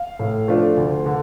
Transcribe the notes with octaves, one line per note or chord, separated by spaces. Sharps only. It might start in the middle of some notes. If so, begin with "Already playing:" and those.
Already playing: F5
A2
F3 A3 D4 F4
D2
D3